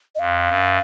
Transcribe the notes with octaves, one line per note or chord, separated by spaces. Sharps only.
D#5
F2 F5
F#2